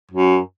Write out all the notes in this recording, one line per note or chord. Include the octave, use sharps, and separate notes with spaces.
F#2